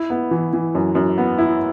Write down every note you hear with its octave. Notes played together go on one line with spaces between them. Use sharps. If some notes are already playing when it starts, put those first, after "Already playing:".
Already playing: E4
B3
E3
E3
F#2
F#2
B3
E4